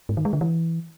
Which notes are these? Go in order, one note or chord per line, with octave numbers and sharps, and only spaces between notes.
G#2
D#3
G#3
D3
E3